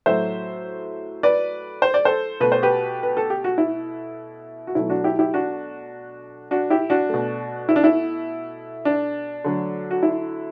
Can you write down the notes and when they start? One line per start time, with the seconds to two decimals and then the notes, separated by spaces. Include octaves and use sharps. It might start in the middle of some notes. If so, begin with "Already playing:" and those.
0.06 A2 F#3 A3 C5 E5
1.23 B4 D5
1.82 C5
1.94 D5
2.05 A4 C5
2.40 B2 A3 B4
2.52 C5
2.63 G4 B4
3.03 B4
3.17 A4
3.30 G4
3.44 F#4
3.58 E4
4.67 F#4
4.75 B2 F#3 A3 E4
4.90 D4 F#4
5.04 E4 G4
5.19 E4 G4
5.34 D4 F#4
6.51 D4 F#4
6.70 E4 G4
6.90 D4 F#4
7.09 B2 A3
7.69 E4
7.76 D4
7.84 E4
8.85 D4
9.44 D3 F#3 A3
9.91 F#4
10.03 E4